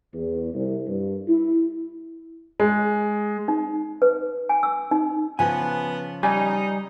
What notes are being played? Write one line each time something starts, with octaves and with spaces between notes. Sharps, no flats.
E2
C2
G2
E4
G#3
D#4
B4
G#5
E6
D#4
C#3 F3 B3 B4 G#5
G3 D#4 G#5